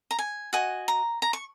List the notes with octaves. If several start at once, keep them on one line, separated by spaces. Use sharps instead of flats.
A#5
G#5
F#4 D#5 G#5
A#5
A#5
C#6